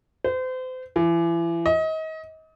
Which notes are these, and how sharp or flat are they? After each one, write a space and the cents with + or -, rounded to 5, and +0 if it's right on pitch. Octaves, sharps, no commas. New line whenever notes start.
C5 -35
E3 +35
D#5 +30